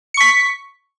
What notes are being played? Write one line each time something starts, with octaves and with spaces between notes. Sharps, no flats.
C#6 B6 C#7